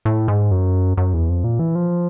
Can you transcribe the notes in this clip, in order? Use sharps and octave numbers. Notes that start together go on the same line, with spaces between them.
A2
G#2
F#2
F#2
E2
F2
A#2
E3
F3